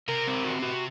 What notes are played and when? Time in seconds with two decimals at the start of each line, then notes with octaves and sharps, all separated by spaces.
0.08 C3 A#4
0.27 C4
0.45 F#4
0.63 F#4